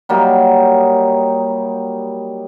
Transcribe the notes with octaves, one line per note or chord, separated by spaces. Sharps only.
F#3 G3 A#3 D#4